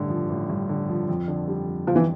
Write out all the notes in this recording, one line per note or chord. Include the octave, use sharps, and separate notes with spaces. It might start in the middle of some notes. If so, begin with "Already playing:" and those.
Already playing: A1 G2 D3
F3
A1
G2
D3
F3
F2
D3
G3
F2
F2 F3
E3